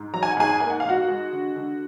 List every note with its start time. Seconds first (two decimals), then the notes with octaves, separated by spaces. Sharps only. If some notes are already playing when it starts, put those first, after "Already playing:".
Already playing: G#2
0.14 F#3 A#5
0.23 G#5
0.31 F#5
0.37 G#2 G#4 G#5
0.60 A#3 G#5
0.70 F#5
0.80 F5
0.85 G#2 F#4 F#5
1.08 G#3
1.32 D3
1.56 D3